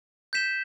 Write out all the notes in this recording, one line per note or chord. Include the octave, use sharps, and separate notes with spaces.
G6 B6 E7 G7